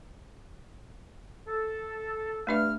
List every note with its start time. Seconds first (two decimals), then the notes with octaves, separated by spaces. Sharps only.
1.48 A4
2.47 G2 A3 D4 E5 F6